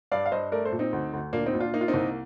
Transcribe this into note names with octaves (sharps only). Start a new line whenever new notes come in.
G2 D5 F5
F5
G2 C5 D#5
A3 A#4 D5
A4 C5
A#2
C4 D#4
D2
D2
A#2 A#3 D4
C4 D#4
A#2
D4 F4
A#3 D#4
F4
C4 D#4
C2